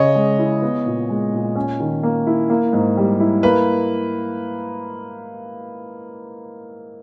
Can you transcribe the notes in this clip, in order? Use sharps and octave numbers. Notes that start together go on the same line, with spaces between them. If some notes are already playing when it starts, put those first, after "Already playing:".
Already playing: C#3 C#4 C#5 D#5
G#3
E4
B3
A#2
G#3
A#2
C#4
D#3
A#3
E4
A#3
G#2
G3
E4
A#3 B4